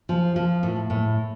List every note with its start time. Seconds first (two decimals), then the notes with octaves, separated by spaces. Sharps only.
0.09 F3
0.36 F3
0.63 A2
0.90 A2